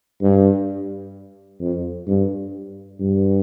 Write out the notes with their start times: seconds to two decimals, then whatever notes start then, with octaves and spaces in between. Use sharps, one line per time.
0.21 G2
1.60 F2
2.07 G2
3.00 G2